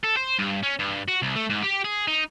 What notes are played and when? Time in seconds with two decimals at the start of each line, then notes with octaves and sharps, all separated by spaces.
0.03 A4
0.17 C5
0.39 G2
0.63 C#4
0.79 G2
1.08 F#4
1.22 C2
1.36 A3
1.50 G#2
1.63 G4
1.85 G#4
2.08 D#4